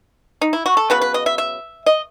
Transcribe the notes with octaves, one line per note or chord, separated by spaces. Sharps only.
D#4
E4
F#4
A4
C#3 F#3 B3 B4
B4
D#5
E5
E5
D#5